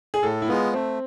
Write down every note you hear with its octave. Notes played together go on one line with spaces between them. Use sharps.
G#4
A2 A4
E4
G#3 B3 F4
A3 C4